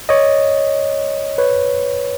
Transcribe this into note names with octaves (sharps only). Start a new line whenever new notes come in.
C#5 D#5
B4 C#5